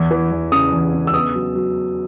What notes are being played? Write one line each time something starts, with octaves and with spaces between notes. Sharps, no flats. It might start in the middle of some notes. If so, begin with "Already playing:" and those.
Already playing: E2
E3
E2
C#3 D#6
E2
C#3
E6
B3 D#6
F#3
F#3